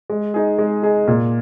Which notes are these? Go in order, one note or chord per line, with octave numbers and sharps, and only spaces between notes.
G#3
D#4 G#4
G#3
D#4 G#4
A#2